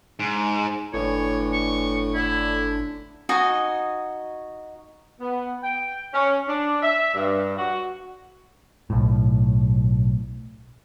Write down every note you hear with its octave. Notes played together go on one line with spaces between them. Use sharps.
G#2
G1 A2 D3 E3 D4 C#5
C#6
D3 E4
D#4 F#4 D#5 G#5
B3
G5
C#4
D4
E5
G2
F#4
B1 A2